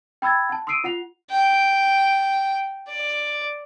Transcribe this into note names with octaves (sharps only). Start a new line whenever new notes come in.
G5 B5 E6 G#6 A6
F#5 A5
C6 D#6 E6 C7 D7 D#7
F4 F#5 C7 F7
G5
D5